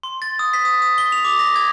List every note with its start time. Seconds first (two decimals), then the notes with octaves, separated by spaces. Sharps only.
0.03 C6
0.22 A6
0.39 D#6
0.53 B6
0.65 D#6
0.82 D#6
0.98 G7
1.12 F7
1.25 D6
1.39 A#6
1.56 G#6